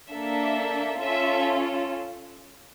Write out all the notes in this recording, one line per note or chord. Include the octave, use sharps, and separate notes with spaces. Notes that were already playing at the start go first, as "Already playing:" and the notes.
A#3 D4 A4 E5
C#4 F4 A4 E5